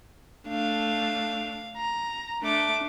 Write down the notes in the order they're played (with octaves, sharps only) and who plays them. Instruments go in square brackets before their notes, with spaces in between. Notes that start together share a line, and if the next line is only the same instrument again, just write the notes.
[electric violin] A3 D4 [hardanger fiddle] F5
[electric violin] A#5
[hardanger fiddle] A3 D6 [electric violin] D4